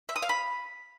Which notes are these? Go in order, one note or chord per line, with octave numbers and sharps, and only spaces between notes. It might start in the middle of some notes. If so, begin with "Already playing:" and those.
E5
D#6
F5
B5